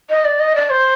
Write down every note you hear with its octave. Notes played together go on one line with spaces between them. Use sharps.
D#5
D5
D#5
D5
C5